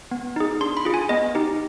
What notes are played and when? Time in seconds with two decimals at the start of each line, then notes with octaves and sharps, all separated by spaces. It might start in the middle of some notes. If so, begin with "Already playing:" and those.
0.11 B3
0.36 D#4 G#4
0.61 D4 C6
0.77 B5
0.85 F4 G#4
0.94 G#5
1.09 B3 D#5
1.35 D#4 G4